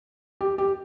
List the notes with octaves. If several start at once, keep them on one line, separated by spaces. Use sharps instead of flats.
G4
G4